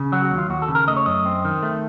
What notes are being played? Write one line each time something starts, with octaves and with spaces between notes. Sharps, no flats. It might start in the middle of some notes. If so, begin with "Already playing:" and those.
Already playing: C#3
F#3 F#4
F#4
D#2
F4
D#2 F#4
A4
C#3
A#4
A3 D#5
C#5
F#2 D#5
C4
D#3
A3